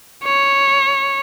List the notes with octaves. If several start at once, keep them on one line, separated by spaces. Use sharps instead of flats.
C#5